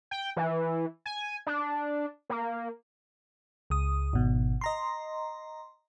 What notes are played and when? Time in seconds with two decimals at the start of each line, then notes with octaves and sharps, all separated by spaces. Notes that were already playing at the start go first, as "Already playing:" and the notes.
0.11 G5
0.37 E3
1.06 G#5
1.47 D4
2.30 A#3
3.70 C#2 D#6
4.13 G#1 B2
4.61 D#5 A#5 C6